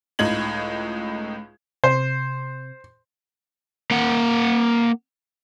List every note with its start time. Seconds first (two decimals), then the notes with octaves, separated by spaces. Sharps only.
0.19 C#2 A2 D#4 G#6 F#7
1.84 C3 C5
3.91 A#3 F#5